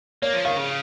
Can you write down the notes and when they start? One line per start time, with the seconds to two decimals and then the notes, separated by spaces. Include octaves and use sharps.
0.22 A#3 C#5
0.33 F3
0.45 D#3 F5
0.56 C#3